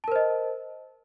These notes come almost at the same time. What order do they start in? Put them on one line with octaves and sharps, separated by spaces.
A5 A#4 C5 D#5